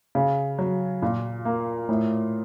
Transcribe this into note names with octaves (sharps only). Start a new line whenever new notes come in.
C#3
F#3
A#2
A#3
A2